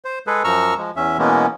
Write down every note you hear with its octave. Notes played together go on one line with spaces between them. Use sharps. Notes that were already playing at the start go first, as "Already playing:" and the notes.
C5
G#3 G#4 A4 B4
F#2 F3 A#5 C#6 E6 F6
F3 G#3
E2 C#4 E5
B2 E3 G#3 A#3 B3 C#4